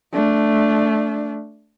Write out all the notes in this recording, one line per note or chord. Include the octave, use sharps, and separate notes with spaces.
A3 D4